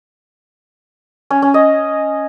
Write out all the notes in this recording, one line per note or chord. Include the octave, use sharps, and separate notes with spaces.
C#4
C#4
D#5